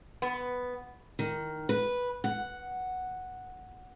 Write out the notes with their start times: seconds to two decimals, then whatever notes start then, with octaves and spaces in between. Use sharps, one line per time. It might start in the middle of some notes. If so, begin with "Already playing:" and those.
0.22 B3
1.19 D#3
1.69 B4
2.24 F#5